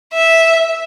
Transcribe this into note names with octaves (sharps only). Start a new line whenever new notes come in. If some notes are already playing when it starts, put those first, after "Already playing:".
E5